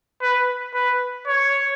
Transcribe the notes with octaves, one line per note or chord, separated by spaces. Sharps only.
B4
B4
C#5